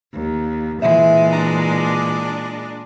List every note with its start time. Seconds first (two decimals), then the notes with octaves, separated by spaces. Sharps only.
0.14 D#2
0.82 A#2 E3 G#3 E4 E5
1.33 D4 A#5